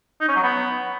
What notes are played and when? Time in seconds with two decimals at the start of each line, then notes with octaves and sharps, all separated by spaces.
0.21 D#4
0.28 C#4
0.35 F#3
0.43 B3